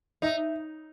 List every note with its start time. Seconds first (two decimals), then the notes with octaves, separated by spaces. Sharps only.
0.22 D#4 E5